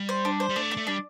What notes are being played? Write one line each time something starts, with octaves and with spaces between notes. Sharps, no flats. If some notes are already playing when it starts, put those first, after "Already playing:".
Already playing: G3
C5
D4
C5
G3
A3 D4
D5
A3
G3 D4